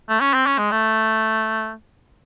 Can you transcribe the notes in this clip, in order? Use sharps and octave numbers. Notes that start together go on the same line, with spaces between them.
A3
C#4
C4
C#4
G#3
A3